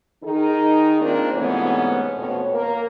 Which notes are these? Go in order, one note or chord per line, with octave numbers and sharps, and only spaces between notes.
D#3 D#4 G#4
A#3 C4 D4 F4 A#4
G#2 C3 E3 A3 B3 C#4
F2 B2 C#5
A#3 A#4